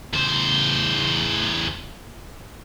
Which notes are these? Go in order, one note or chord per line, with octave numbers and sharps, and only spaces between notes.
E2 C5